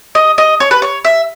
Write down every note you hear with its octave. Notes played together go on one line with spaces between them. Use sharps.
D#5
D#5
C#5
B4
C#5
E5